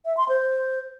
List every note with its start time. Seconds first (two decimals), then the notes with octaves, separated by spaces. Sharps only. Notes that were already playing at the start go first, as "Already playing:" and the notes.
0.05 E5
0.17 C6
0.29 C5